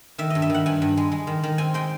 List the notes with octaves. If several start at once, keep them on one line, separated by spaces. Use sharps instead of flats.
D#3 E5
G2 D#5
E5
D#3 F#5
G2 G#5
G2
G#3
G#3
D#3
D#3
C4 G#5
G#3 G5